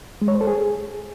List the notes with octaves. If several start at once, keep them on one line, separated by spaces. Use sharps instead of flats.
G#3
C#5
C5
A4
G#4